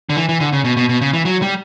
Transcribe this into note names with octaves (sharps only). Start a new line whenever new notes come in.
D3
E3
E3
D3
C#3
B2
B2
B2
C#3
E3
F#3
G3